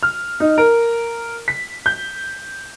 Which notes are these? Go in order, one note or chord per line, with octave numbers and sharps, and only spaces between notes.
F6
D#4
A#4
B6
G6